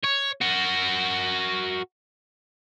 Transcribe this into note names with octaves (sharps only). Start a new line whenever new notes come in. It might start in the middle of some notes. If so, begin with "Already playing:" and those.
C#5
F#4 A#4